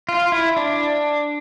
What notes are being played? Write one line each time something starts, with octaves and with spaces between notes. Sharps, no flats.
F4
E4
D4